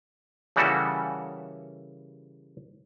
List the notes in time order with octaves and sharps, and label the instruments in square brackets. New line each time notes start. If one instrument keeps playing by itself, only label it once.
[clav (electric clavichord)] C#3 E3 G3 A#3 F#4 A4